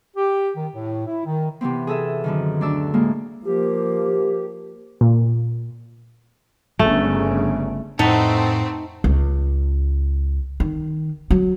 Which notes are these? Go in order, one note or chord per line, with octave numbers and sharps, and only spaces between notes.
G4
D#3
A2
E4
D#3
C3 E3 B3 C4
G#4 A4 E5
F#2 D3 D#3
D2 D4 D5 E6
A2 G#3 A#3
F3 A#3 G4
A#2
G1 C#3 A3
F2 A2 A3 C4 D#4 B4 F#5 A5
C#2
D#3
F#3